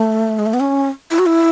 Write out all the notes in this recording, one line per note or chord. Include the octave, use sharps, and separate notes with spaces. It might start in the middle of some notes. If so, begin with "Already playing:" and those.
Already playing: A3
G#3
A3
B3
C#4
E4
F#4
E4